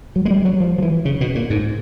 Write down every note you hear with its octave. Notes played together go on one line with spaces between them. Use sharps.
F#3
G#3
G3
F#3
F3
F3
E3
C#3
B2
A#2
G#2